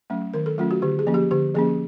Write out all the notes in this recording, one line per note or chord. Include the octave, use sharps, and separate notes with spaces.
F#3 A3 C#4
D#3 A#4
A4
F#3 A3 C#4 F4
F#4
D3 G4
G#4
F3 A#3 C#4
G4
D3 G4
F3 A#3 C#4 G#4